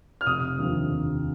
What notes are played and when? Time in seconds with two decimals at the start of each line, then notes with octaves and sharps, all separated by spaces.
0.21 F6
0.26 F1 D#6
0.58 D#2 D3 F3
0.90 F1